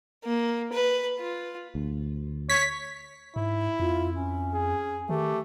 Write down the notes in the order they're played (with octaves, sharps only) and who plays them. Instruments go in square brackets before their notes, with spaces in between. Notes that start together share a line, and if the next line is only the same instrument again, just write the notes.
[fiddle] A#3
B4
F4
[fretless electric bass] D2
[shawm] C#5 [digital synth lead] B6
[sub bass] G#2 [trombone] E4
[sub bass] F2 [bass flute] F4
[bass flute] C#4
[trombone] G#4
[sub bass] D#3 [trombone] A3 [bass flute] G4